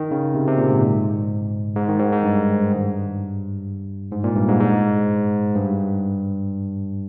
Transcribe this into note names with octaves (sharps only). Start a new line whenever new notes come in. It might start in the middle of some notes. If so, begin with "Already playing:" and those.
Already playing: D#3
C#3
C3
C3
A#2
G#2
G#2
D#3
G#2
G#2
G2
G#2
A#2
G2
G#2
G#2
G2